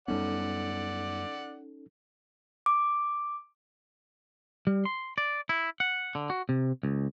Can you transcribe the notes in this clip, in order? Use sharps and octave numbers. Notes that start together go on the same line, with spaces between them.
F#2 G3 B3 C#4 D#4 A4 D5 F#5
D6
G3
C6
D5
E4
F#5
D3
F#4
C3
C#2